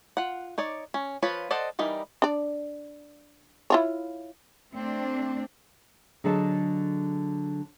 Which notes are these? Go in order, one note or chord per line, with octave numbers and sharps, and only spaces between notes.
F4 F#5
D#4 C#5 D5
C#4
F3 F4 B4 C#5
A4 C5 D5 D#5 F#5
E3 G3 D#4 A#4
D4 D5
E4 F4 C#5
A3 C4 D4
D3 F#3 G#4 A4 D#5 A5